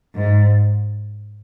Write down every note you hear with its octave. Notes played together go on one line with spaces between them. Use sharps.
G#2